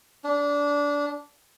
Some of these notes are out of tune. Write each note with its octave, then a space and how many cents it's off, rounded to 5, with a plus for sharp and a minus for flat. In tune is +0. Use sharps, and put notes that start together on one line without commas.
D4 -20